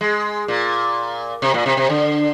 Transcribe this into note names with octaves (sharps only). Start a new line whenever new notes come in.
G#3
A#2
C3
A#2
C3
C3
D3